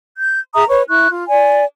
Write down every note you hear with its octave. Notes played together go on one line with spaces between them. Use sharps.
G6
G#4 E5 A#5 D#6
B4 C#5 C#6
E4 C#6 F#6
F4
D5 G#5